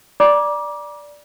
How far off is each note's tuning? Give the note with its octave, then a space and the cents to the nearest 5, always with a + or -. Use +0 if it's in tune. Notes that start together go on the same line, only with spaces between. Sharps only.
D5 +0 A#5 +40 D6 +0